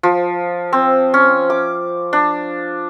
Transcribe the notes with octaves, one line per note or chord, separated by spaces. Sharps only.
F3
C4
C#4
D6
D4